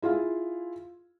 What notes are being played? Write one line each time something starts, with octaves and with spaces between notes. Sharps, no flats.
E4 F4 G#4 F5